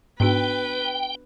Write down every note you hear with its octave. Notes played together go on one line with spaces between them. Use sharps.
G#2 B3 D4 F#4 B4 G5 D7